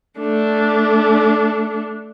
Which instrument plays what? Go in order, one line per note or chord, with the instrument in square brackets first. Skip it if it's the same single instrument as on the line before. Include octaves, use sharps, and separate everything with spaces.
[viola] A3 D4